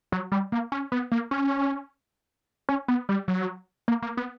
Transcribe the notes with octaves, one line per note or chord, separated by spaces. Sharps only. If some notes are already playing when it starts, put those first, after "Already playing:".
F#3
G3
A#3
C#4
B3
A#3
C#4
C#4
B3
G3
F#3
A#3
A#3
B3